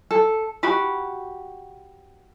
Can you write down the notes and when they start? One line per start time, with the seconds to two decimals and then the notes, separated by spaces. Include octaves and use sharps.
0.11 A4
0.63 F#4 G4 B5